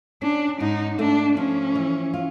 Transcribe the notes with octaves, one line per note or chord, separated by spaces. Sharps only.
C#4 D4
G#2 D#4
A3 D4
F3 C#4
E3
F4